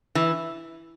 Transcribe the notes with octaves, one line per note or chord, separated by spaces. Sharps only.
E3